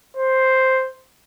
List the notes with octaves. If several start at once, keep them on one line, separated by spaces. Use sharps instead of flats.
C5